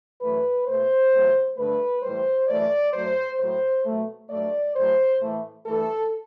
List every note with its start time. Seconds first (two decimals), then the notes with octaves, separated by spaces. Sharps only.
0.21 F#2 E3 A3 B4
0.66 B2 A3 C5
1.12 E2 C3 F#3 A3
1.58 G2 D3 A3 B4
2.03 A2 E3 G3 C5
2.48 F#2 E3 A3 D5
2.94 F#2 F#3 A3 C5
3.39 A2 F#3 A3 C5
3.86 B2 F#3 A3
4.30 G2 F#3 A3 D5
4.76 A2 F#3 A3 C5
5.21 A2 E3 A3
5.66 G2 E3 A3 A4